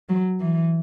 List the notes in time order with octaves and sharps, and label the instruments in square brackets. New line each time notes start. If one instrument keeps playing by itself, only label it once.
[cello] F#3
E3